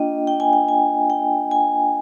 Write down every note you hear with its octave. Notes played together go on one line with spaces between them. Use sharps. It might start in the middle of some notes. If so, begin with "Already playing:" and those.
Already playing: A#3 D4 F4 D#5 G5
G5
G#5
G5
G#5
G5
G#5